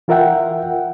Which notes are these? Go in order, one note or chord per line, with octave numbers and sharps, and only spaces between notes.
E3 F4 A#4 E5 F#5 G5